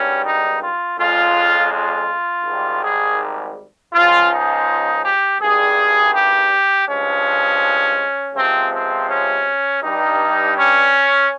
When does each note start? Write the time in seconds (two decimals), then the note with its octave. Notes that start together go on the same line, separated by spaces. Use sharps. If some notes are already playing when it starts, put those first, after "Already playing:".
Already playing: G#1 G2 G3 C#4
0.25 D#4
0.62 F4
0.98 F2 C#3 G#3 F4
1.72 F4
2.45 G#1 G#2 D#3 G3
2.83 G#4
3.93 C#2 C#3 F3 G#3 F4
4.30 D#4
5.03 G4
5.40 G#1 G2 G3 G#4
6.13 G4
6.87 G2 F3 G#3 C#4
8.34 C#2 C3 F3 G#3 C4
8.72 C4
9.08 C#4
9.81 G2 G3 D#4
10.55 C#4